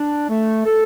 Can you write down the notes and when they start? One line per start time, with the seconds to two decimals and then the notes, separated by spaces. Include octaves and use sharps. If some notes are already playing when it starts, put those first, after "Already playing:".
Already playing: D4
0.29 A3
0.65 A4